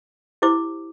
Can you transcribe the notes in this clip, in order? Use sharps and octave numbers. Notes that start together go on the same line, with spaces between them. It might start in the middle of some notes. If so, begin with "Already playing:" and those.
E4 G4 C5 D6